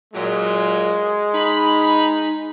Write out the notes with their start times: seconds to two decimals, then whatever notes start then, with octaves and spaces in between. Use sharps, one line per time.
0.14 A#2 F#3 G#3
1.34 D#4 B5